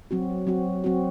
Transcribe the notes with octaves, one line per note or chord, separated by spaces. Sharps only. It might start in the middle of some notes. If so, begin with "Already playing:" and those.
F#3 C4 F#4
F#3 C4 F#4
F#3 C4 F#4